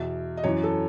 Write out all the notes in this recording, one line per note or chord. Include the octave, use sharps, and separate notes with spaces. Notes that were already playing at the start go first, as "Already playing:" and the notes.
Already playing: E2 B2 E5
D#5
F#2 E3 C#5
A4